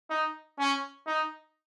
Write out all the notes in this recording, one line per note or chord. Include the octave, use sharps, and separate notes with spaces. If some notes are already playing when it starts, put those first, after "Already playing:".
D#4
C#4
D#4